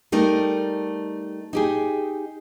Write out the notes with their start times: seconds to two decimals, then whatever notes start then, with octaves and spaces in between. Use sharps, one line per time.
0.12 G3 A3 D#4 A#4
1.53 D#4 G4 G#4